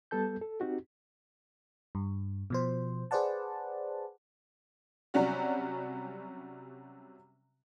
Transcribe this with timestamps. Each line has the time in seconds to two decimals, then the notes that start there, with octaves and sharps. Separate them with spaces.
0.11 G3 B3 A4 A5 G6
0.41 A4
0.60 C4 D#4 F#4 G4
1.95 G2
2.50 B2 F3 C5
3.11 G#4 B4 C5 D5 F#5 A5
5.14 C3 F#3 G3 C#4 F#4